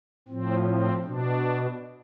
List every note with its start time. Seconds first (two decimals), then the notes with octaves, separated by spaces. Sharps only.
0.28 A2 F3 C4
0.67 C4
1.05 B2 D4